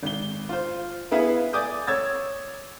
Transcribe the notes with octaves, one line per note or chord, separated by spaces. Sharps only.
G#1 G7
F4 C5
B3 E4 G#4 B4 E5 F5
D5 G#5 D6 D#6 G6
C#5 E6 G#6 A6